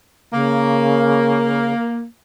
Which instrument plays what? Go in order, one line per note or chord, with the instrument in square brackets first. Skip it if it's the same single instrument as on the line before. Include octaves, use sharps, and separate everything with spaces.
[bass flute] C#3 [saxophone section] A#3